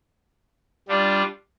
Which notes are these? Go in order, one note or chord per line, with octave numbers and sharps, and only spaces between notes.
G3 D4 F4